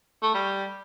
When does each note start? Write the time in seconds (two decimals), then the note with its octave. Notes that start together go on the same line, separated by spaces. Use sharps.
0.22 A3
0.34 G3